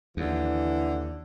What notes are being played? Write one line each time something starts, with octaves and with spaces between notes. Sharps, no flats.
D#2 D3 E3